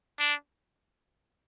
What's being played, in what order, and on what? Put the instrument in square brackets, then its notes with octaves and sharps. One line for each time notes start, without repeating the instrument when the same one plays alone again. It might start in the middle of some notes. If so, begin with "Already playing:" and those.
[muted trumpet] D4